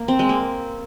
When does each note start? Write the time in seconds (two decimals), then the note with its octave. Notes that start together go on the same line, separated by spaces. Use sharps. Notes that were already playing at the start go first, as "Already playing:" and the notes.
Already playing: A#3
0.08 C4
0.19 G#3
0.29 A#3